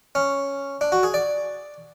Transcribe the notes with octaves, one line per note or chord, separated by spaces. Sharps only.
C#4
D4
F#4
G#4
D5